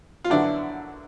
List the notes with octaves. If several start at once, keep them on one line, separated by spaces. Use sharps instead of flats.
F4
F#2 D3 F#3 B3 D4 E4